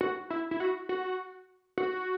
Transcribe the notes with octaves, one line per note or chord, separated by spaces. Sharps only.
F#4
E4
E4
F#4
F#4
F#4